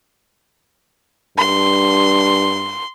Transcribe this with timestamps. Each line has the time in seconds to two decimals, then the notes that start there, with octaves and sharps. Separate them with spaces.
1.38 G2 C6